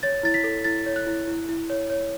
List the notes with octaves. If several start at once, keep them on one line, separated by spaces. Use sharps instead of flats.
C#5 A6
E4 A6
B6
A4
E4 A6
C#5
F#6
E4
E4
E4
C#5
C#5